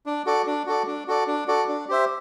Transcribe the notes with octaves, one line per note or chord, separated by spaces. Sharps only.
D4
F#4 A4 D5
D4
F#4 A4 D5
D4
F#4 A4 D5
D4
F#4 A4 D5
D4
G4 C5 E5